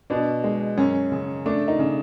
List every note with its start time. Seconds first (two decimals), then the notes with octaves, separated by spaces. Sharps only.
0.10 B2 D4
0.44 G#3
0.77 F#2 C#4
1.12 C#3
1.46 A3 D4
1.68 D#4
1.79 C#3